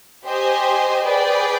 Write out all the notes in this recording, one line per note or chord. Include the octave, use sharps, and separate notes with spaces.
G4 C5 D#5 G#5
G#4 B4 D5 G5